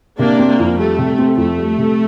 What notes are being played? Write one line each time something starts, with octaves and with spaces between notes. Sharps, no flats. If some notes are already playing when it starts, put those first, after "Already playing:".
C3 A#3 D4
C4
A#3
F2
G3 A3
C3
C4
F2 A3
G3
C3